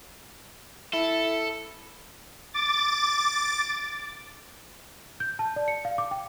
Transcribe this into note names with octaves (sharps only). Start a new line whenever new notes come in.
E4 A4
D6 A6
G6
A5
D5
C#7
F5
D6
G5